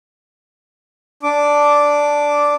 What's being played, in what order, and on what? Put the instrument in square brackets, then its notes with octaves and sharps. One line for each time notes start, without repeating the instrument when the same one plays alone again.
[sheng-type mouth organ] D4 D6